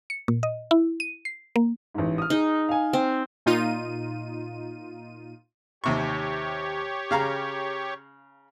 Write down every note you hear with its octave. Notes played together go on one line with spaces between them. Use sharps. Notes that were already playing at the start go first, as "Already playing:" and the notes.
C#7
A#2
D#5
E4
D#7
C7
A#3
A1 G#2
D#6 F6
D#4 G#4
F5 G#5
C4
A#2 D#4 F4 D#7
D#2 C3 G4 C#5 C#6
C#3 F5 A#5